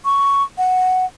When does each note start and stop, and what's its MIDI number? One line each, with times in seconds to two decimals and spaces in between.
0.05 0.43 85
0.58 1.05 78